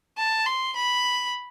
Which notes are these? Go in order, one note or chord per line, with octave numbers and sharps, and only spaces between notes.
A5
C6
B5